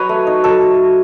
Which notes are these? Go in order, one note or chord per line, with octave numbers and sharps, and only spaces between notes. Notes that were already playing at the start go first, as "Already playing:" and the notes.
Already playing: F#3 B4 C#5 D#5
A3
D#4
F#3 A4